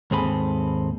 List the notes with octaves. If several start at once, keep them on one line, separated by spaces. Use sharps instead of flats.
D#2 G#2 C4 G#4 A4 B5